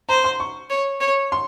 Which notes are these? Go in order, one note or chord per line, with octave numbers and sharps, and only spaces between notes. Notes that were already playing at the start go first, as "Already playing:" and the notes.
C5 A#5
C6
C#6
C#5
C#5
C6